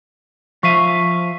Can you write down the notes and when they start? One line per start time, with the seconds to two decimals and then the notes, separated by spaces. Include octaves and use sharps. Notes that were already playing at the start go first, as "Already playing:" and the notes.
0.63 F3 E5 F5 C#6 D#7